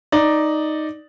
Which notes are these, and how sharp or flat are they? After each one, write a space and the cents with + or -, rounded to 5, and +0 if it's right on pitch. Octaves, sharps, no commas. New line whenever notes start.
D#4 +0 D5 +0